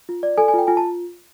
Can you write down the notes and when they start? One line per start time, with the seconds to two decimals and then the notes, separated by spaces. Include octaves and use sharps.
0.09 F4
0.23 D5
0.38 A4 G#5
0.48 G#5
0.54 F4 G5
0.67 F4 G#5
0.77 A5